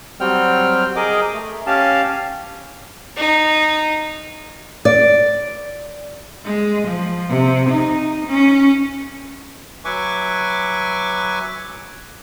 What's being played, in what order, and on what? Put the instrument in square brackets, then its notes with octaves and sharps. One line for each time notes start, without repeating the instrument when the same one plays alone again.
[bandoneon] F#3 G3 C4 G5 F6
G#4 A#4 D#5 D6
A3
C#4 G4 F5 A5
[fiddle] D#4
[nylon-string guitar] D5
[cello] G#3
F3
C3
D#4
C#4
[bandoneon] F#3 B4 E5 G#5 C#6 D6